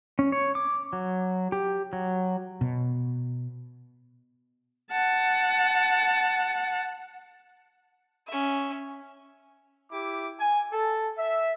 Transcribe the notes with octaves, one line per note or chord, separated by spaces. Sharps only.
C#4
C#5
D6
F#3
G4
F#3
B2
F#5 A5
C#4 E5
E4 G4 D6
G#5
A4
E5